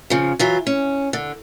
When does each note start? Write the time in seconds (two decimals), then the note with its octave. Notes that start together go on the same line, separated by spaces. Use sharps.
0.10 C#3 F3
0.39 E3 F#3 F4
0.67 C#4
1.13 D3